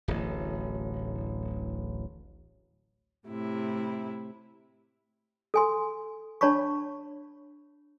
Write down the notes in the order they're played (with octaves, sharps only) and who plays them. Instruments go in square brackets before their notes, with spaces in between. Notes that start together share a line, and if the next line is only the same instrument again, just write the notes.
[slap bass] D1 A1
[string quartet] A2 C3 E4
[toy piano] A4 G#5 C6
D4 C#5 A5 B5 C#6